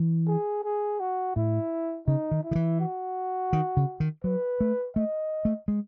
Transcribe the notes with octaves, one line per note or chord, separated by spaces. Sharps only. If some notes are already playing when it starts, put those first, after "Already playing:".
Already playing: E3
G#4
G#4
F#4
A2 E4
C#3 D#4
D#3
E4
D#3
E3
F#4
D#3
C#3
D#3
F#3 B4
A3
A3 D#5
A3
G#3